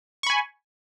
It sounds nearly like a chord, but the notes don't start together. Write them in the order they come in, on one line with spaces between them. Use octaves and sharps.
C#6 B5 G#5